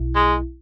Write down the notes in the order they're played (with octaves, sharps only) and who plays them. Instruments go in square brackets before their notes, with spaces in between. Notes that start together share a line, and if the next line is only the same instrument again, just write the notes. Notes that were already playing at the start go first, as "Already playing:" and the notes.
Already playing: [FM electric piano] B1 B2 E4
[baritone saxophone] G#3